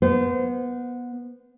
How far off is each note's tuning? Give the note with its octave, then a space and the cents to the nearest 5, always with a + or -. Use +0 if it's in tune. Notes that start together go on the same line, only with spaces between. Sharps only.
B3 -20 C5 -35